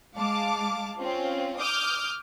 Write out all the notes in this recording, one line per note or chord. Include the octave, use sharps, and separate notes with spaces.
G#3 F5 A5 D6
C4 C#4 F4
D6 D#6 F6 G6